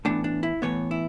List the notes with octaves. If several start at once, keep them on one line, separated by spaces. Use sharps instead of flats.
A2 E3 B3 D4
D4
E4
A2 E3 B3 C#5
E4